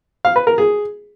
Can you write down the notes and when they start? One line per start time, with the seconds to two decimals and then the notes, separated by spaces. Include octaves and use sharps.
0.25 F5
0.36 B4
0.47 A#4
0.58 G#4